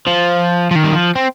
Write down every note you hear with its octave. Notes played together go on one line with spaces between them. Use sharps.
F3
F3
D#3
G3
F3
C4